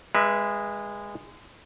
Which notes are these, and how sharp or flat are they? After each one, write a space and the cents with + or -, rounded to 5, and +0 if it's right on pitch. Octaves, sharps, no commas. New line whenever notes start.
G#3 -20 B4 -20 E5 +15